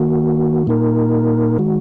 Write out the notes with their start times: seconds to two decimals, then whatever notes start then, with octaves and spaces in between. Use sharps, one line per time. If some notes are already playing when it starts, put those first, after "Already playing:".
Already playing: D#3 A#3 F#4
0.67 A#2 A#3 D#4 A#4
1.59 D#3 G#3 F#4